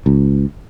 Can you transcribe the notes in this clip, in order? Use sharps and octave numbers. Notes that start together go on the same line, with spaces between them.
C#2